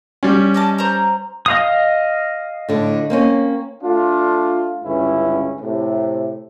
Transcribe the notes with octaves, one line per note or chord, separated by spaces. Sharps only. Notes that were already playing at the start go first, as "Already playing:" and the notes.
G3 C#4
D5 D#5 A5
C5 A#5
D#5 F5 D#6
A2 D3
A#3 C4 C#4
A3 D4 F4
C#2 G2 D3 C#4 E4
A2 C3